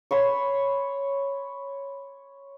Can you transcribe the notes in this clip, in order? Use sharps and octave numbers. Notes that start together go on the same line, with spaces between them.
C#5 B5 C6